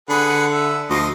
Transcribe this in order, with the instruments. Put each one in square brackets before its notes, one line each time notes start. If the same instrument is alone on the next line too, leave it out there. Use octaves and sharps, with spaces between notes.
[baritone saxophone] D3 [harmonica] G#4 B4 F#5
[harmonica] E5
[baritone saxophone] D2 [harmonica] F3 D#5